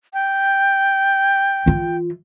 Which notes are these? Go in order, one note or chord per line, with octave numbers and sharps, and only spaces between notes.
G5
E3 F4